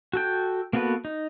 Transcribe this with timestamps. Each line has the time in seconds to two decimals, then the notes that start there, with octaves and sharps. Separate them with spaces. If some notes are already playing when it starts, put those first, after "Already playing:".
0.13 F#4 A4 G5
0.73 A#3 B3 F#4 A4 B4
1.05 D#4